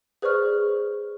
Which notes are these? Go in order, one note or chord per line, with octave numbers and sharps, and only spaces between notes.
G#4 B4 C5 D5 C#6 F6